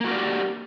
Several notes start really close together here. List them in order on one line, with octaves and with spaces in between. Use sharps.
A#3 F#4 A#4 D5 G4